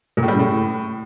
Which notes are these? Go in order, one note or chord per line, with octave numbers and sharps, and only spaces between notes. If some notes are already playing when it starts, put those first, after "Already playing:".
A#2
A2
G3
C#3
A2